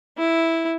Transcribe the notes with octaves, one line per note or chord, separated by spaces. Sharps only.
E4